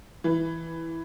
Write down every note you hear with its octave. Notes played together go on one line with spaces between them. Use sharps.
E3